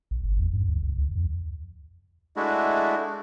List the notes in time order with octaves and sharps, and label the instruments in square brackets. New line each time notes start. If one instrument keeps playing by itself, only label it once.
[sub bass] A#1
G1
E2
G2
D2
C#2
D2
F2
[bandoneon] G#3 A3 D4 E4 F#4